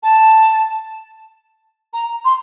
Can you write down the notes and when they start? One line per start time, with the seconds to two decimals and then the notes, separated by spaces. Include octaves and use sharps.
0.03 A5
1.93 A#5
2.25 C6